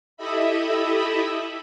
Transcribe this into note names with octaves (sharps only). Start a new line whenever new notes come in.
E4 G4 A4 D#5 E5 B5